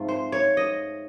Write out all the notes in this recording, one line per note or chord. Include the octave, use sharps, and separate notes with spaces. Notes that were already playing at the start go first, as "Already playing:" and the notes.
Already playing: G#2 F3 A3 C4
C5
C#5
D#5